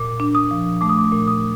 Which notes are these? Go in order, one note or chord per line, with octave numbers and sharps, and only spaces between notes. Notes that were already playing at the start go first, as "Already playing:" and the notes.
Already playing: A#2 D6
D4
D#6
F3
A3 D6
D#6
D6
A#2
D#6